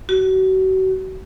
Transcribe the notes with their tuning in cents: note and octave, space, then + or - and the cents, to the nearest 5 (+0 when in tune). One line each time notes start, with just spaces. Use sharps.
F#4 +35